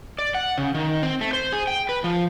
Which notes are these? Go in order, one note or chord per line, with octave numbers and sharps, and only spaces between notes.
D5
F#5
C#3
D#3
C4
A3
C5
G#4
G5
B4
F3